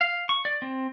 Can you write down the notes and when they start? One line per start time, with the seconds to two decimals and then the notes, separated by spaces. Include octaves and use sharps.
0.01 F5
0.29 C#6
0.45 D5
0.62 C4